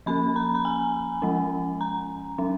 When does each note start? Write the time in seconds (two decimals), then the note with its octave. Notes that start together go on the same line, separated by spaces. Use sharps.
0.06 F3 A#3 C#4 B5
0.36 A#5
0.55 A#5
0.65 G#5
1.22 F3 G#3 C#4
1.81 A#5
2.38 F#3 C#4